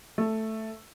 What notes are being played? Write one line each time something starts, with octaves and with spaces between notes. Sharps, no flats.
A3